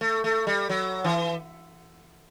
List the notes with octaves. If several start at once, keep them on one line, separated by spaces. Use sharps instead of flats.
A3
A3
G3
F#3
E3